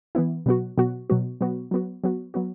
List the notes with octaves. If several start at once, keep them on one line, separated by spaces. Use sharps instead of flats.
E3 B3 E4
B2 F#3 B3 F#4
B2 F#3 B3 F#4
B2 F#3 B3 F#4
B2 F#3 B3 F#4
F#3 B3 F#4
F#3 B3 F#4
F#3 B3 F#4